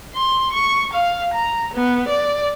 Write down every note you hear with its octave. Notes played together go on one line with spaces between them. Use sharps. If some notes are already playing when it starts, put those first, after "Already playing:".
C6
C#6
F5
A#5
B3
D5